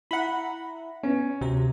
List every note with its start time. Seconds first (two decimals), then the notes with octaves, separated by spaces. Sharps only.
0.11 E4 E5 F#5 A#5 B5
1.03 B3 C#4
1.41 D2 C3 F#4 A#5